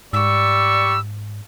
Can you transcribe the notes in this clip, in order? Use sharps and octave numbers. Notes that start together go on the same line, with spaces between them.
G#2 G3 D5 C#6 E6